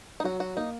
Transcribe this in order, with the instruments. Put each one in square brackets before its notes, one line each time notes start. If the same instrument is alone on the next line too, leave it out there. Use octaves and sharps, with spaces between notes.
[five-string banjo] D#4
[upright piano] F#3 [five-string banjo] F#4
[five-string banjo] F#4
[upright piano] A#3 [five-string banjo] D#4